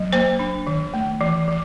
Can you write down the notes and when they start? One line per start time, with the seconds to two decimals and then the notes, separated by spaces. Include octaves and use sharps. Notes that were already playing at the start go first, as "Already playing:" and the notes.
Already playing: F#3
0.13 A#3 C5
0.39 D4
0.67 D#3
0.94 A3
1.21 E3
1.48 E3